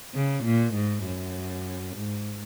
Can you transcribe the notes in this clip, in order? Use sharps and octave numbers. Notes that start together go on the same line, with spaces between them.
C#3
A#2
G#2
F#2
G#2